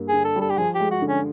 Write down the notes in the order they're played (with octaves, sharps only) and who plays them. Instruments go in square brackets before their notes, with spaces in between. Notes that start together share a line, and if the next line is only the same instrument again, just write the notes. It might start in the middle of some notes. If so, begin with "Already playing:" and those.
Already playing: [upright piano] G2 A#3
[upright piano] D3 [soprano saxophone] G#4
[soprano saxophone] A4
[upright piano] G3
[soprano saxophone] A4
G4
[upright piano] F3 [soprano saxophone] G#4
[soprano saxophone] G4
[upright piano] G#3
[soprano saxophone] F#4
[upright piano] D3
[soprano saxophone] C#4